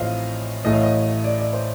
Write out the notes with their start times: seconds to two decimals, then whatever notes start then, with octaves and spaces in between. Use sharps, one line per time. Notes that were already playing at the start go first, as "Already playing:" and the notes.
Already playing: A1 A2 F3 C4 D#5 F5
0.65 A1 A2 A3 D#5
0.73 F5
0.83 D#5
1.24 D5
1.38 D5
1.53 C5